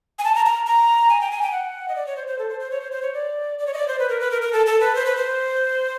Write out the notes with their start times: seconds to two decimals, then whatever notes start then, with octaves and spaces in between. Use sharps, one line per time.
0.19 G#5
0.24 A5
0.35 A#5
0.45 A#5
0.67 A#5
1.09 G#5
1.21 G5
1.31 G#5
1.42 G5
1.52 F#5
1.88 D#5
1.95 D5
2.06 C#5
2.16 C5
2.27 C5
2.38 A4
2.49 C5
2.60 C5
2.71 C#5
2.81 C5
2.92 C5
3.02 C#5
3.14 D5
3.58 D5
3.67 C#5
3.73 D#5
3.77 D5
3.88 C5
3.99 B4
4.09 A#4
4.20 B4
4.31 A#4
4.42 A#4
4.53 A4
4.66 A4
4.80 B4
4.95 C5
5.06 B4
5.16 C5